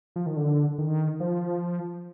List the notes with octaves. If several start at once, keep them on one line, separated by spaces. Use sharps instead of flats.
F3
D#3
D3
D#3
F3